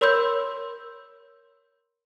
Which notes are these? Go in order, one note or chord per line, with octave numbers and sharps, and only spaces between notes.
A#4 C#5 B5 C6 E6 G6